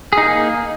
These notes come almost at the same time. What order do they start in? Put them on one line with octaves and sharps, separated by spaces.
G#4 D#4 A#3